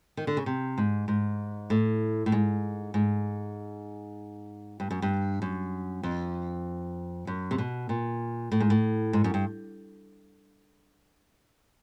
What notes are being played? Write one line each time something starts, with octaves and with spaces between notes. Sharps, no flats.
D#3
D3
C#3
C3
G#2
G#2
A2
A2
G#2
G#2
G2
F#2
G2
F#2
F2
F#2
C3
B2
A#2
A2
G#2
A2
G#2
F#2
G2